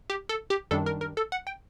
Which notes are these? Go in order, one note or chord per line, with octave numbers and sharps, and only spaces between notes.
G4
A4
G4
F#2 D#3 G3 D4 A4
A#4
A#4
A4
F#5
G5